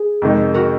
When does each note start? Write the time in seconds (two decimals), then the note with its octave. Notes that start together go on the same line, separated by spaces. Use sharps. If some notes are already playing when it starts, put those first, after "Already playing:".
Already playing: G#4
0.22 F2 C3 D#3 G#3 D#4
0.54 F#4 A#4